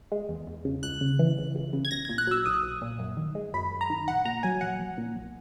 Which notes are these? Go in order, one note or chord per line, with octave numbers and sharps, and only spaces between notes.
G#3
E2
E2
C#3
C#2 F#6
C#3
E3
C#2
C#2
C#3
G#6
B1 A#6
A#2 G#6
F#6
F#3 E6
B1 D#6
B1
A#2
F#2
D#3
G#3
F#2 B5
F#2
A#5
D#3
A#1 F#5
A#2 A#5
F#3 G#5
A#1 F#5
A#1
A#2
B1